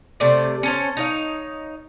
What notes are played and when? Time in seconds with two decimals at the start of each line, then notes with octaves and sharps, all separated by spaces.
0.20 C3 A3 C5 D5
0.63 C#4 A4 C5
0.97 D#4 C#5 F5